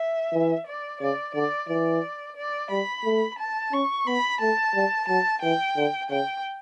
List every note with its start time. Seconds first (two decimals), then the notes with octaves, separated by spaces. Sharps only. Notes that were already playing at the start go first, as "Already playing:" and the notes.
Already playing: E5
0.33 E3
0.67 D5
1.01 C#3 D5
1.35 D3 D5
1.69 E3 D5
2.37 D5
2.71 G3 B5
3.04 A3
3.39 A5
3.72 C#4 C#6
4.07 B3 B5
4.41 A3 A5
4.74 G3
5.08 F#3 A5
5.42 E3 G5
5.76 D3
6.10 C#3 G5